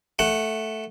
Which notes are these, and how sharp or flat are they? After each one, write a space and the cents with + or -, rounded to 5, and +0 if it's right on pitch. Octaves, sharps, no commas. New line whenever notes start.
A3 +0 F#5 +5